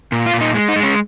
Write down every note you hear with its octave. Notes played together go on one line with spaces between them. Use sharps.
A#2
F4
A#2
D#4
G#3
D#4
G#3
C#4